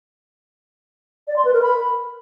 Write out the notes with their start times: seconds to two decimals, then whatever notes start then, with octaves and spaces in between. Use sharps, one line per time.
1.27 D5
1.36 C6
1.45 B4
1.53 A#4
1.62 B5